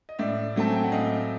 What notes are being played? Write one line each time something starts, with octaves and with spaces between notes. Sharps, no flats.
D#5
A2 D5 E5
F#3 A3 C4 A5
G#5
G5
F#5
A2 D#5 F5